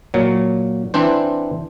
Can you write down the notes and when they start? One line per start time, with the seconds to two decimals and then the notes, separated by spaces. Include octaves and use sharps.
0.14 A#2 F#3
0.94 E3 C4 D4 C5